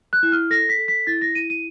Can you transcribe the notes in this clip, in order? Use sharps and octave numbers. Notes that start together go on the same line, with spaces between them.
F#6
E4
F6
A4 A#6
B6
A4
B6
E4 A6
A#6
E4 D#7
D#7